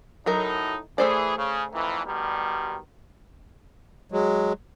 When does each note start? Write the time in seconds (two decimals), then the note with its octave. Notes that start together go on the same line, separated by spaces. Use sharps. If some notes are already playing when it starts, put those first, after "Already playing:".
0.26 A2 F#3 D#4 A4 A#4
0.98 E3 A3 G#4 C5 D5
1.37 C#3
1.73 F2 D#3 E3
2.06 B2 D#3 G3
4.12 F#3 G#3